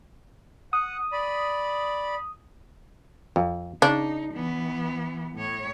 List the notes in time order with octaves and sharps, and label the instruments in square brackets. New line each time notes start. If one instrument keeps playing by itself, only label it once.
[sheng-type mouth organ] F#5 [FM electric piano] D#6
[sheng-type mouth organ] D5 B5
[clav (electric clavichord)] F2
[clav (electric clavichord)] C#3 [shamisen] D4 [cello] D#4
[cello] E3 B3
A2 C#5